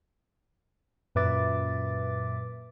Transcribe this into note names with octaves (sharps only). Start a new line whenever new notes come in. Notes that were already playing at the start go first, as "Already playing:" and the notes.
F#2 A#2 B4 E5 D6 A6